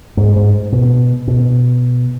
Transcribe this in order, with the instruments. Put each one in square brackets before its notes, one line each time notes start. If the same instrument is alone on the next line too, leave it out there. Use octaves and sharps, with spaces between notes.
[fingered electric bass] G#2
G#2
B2
B2